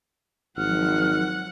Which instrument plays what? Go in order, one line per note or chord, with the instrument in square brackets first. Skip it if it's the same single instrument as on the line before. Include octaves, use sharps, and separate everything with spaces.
[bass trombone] G#1 [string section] F3 F#3 [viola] F#5 [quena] F6